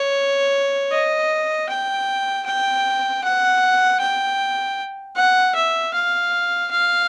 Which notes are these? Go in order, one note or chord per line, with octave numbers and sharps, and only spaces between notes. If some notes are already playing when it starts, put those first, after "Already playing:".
Already playing: C#5
D#5
G5
G5
F#5
G5
F#5
E5
F5
F5